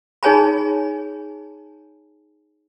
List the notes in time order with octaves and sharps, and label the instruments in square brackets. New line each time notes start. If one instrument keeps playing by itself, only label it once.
[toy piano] D#4 G#4 C#5 G#5 A5 B5